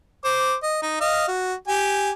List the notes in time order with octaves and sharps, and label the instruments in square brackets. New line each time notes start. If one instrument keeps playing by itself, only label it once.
[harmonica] C5 D6
D#5
D#4
D#5 F5
F#4
G4 G#5